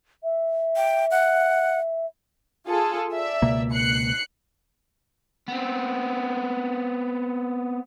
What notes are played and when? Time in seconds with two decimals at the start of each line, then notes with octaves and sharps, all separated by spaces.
0.23 E5
0.76 G5
1.11 F#5
2.67 F4 G#4 A4
3.13 D5 E5
3.42 C#2 B2 A#3
3.73 F#6 C7 C#7
5.48 B3 C4